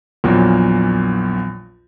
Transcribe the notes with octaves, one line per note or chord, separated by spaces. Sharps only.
A#1 E2 A#2 F#3